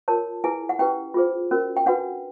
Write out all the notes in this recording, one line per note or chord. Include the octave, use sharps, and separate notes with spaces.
F4 A#4 C#5 A5
E4 G#4 B4 G#5
F#5
C#4 E4 G4 B4 G5
F4 G#4 C5
C#4 F#4 A#4
G5
D4 F#4 B4 F#5